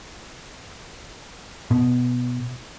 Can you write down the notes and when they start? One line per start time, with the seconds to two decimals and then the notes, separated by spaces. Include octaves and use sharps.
1.71 B2